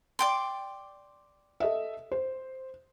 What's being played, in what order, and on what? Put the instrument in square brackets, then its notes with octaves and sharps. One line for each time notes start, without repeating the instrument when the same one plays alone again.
[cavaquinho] D5 G5 C6
[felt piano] A4 D#5 E5
C5